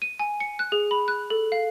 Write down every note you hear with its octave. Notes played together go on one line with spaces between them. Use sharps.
D#7
G#5
C#7
F#6
G#4
B5
F#6
A4
F5